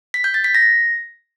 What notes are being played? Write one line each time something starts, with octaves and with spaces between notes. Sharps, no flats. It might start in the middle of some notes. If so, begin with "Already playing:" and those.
B6
G6
A6
B6
A#6